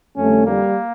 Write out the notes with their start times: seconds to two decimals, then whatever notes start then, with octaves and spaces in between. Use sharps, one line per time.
0.16 F2 D3 G3 A3 C#4
0.45 G3 A#3